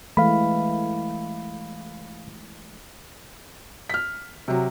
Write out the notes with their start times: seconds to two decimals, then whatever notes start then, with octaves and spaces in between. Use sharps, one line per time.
0.17 E3 G#3 A3 F5 B5
3.90 F6 B6
4.48 C3 F#3